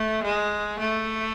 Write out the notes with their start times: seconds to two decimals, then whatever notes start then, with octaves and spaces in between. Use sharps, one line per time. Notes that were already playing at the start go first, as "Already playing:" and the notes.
Already playing: A3
0.23 G#3
0.79 A3